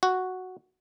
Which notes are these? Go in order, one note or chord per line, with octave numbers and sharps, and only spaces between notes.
F#4